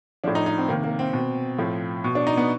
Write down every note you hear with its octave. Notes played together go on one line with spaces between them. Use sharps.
A2 F3 D4
D#4
D#4
C4
C3 D#3 A#3
A#3
C4
B2
A2 F3
B2
D4
D#4
B3